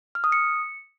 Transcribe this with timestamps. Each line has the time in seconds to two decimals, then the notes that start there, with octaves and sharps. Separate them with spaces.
0.15 F6
0.24 D#6
0.32 C#7